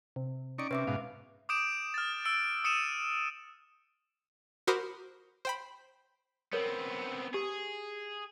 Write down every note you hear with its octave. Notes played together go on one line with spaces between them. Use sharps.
C3
C#4 D#4 D5 C#6 D7
C3 C#4 B4 E5 D6
G#2 B2 F5
D6 D#6 G6 D7 E7
F6 A6
E6 D7
D#6 C#7 D#7 E7
F#4 A#4 C5 B5 D6 D#6
C5 G5 B5
B3 C4 A#4 C#5
G4 G#4